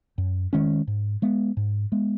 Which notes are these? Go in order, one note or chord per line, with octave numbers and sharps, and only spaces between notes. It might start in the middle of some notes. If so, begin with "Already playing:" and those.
F#2
D#3 G#3 C#4
G#2
G#3 B3
G#2
G#3 B3